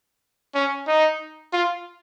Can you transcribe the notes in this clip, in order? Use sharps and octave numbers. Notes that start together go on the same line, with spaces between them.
C#4
D#4
F4